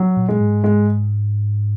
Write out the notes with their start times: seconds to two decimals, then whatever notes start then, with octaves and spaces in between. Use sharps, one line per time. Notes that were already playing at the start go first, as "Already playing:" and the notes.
Already playing: F#3
0.17 A#2
0.29 G#3
0.40 G#2
0.64 G#3